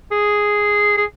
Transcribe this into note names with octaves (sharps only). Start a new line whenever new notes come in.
G#4
G#4